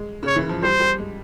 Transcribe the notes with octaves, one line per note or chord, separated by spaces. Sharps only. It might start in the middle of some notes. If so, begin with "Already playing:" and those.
Already playing: G#3
C#3 C#5
E3
F3
G3 C5
G3
G#3